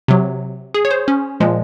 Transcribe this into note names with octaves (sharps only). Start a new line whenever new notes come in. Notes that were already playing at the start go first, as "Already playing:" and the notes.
C3 F#3
G#4
C#5
C5
C#4
A#2 F3 G#3